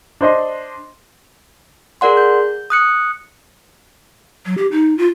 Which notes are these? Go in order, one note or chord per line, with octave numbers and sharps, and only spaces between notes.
D4 C5 D#5 C6
G#4 A#4 D5 F#5 C6
G6
D#6 F#6 C#7
F#3
G4
D#4
F4